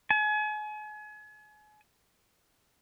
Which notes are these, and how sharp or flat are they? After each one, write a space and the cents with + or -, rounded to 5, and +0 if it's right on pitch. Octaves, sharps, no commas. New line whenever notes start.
G#5 +35